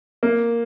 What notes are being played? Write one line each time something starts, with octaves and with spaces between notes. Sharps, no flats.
A#3